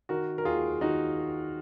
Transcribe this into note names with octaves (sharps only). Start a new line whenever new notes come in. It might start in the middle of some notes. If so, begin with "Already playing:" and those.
D#3 F#4 A#4
A#4
D#2 F4 G#4
D#3 D#4 F#4